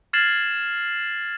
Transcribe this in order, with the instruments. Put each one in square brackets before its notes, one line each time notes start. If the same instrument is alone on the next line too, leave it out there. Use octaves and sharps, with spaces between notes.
[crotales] F6 G#6 A6 C7 E7 F#7